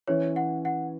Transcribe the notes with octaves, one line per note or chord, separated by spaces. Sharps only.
E3 C#4 E4 C#5
F#5
F#5